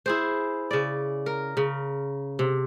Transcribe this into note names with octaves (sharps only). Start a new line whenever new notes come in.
E4 G#4 C5
C#3 D5
A#4
C#3
C3